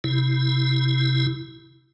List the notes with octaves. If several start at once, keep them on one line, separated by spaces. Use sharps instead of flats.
C3 E4